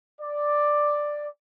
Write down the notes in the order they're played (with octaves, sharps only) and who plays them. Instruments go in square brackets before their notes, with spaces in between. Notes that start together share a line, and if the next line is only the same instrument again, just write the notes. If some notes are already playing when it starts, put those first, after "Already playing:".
[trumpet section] D5